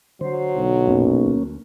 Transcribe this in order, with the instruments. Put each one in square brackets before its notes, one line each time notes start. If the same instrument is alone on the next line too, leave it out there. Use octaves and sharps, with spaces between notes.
[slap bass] D3 [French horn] F#3 [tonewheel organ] C5
[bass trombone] B1
[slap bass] A#1 F2 A2 [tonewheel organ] A#3 C#4
[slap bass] D2